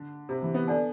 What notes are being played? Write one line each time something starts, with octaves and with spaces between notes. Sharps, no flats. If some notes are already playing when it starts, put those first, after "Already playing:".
Already playing: D3
C3
E3
B3
D4 A4 D5 F#5 A5